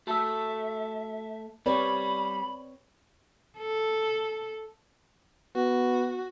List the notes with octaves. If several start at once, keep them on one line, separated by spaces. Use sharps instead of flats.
A3 F#4 A4 E5 E6
G3 C4 G4 B4 C#5 D5 B5
A4
B3 F#4